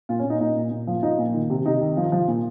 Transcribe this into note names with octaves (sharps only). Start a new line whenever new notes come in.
A#2 F4
C#4
A#2
D#4
A#2 D#4
A#2
A#2
F3
F3 D#4
A#2
D#3
C3
C3 D#4
D#3
F3
F3
A#2